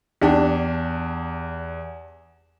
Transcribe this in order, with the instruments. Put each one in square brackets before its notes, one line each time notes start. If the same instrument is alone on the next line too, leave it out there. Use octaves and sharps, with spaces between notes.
[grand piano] E2 [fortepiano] D4 G4